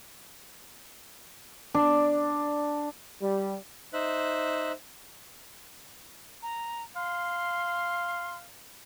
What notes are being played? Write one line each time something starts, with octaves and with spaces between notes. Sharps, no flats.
D4
G3
D#4 C5 E5 F#6
A#5
F5 C6